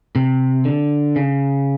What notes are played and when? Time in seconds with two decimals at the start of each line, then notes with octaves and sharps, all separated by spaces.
0.16 C3
0.65 D3
1.16 C#3